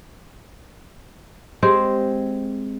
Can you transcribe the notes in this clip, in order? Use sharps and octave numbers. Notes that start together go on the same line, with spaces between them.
G#3 C4 G4 C5